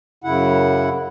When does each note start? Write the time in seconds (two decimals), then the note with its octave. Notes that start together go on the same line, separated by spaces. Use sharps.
0.24 F#2 C#3 E4 F#5